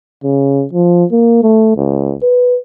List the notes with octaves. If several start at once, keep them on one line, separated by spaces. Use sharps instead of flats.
C#3
F3
A#3
A3
C#2
B4